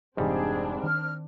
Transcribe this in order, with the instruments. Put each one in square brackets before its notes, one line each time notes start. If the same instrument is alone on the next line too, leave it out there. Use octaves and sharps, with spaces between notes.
[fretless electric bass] F1 C3 E3 [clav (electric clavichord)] G#2 G3 [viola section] C4 D4 [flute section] G#4
[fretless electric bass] D#3 [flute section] F6